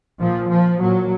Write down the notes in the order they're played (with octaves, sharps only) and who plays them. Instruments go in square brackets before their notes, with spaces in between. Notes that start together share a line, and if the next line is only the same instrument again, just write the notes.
[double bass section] A#2 F3
F3
A#2 F#3